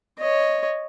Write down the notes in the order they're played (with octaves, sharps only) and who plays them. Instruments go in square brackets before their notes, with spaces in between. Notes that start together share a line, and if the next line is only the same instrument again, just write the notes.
[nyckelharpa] C#5 D#5